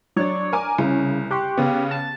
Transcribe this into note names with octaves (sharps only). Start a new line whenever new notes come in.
F#3 D4 C#5 D5
A#4 G#5 D6
C2 C#3
G4 C6 C#6 F#6
C#3 B3
A5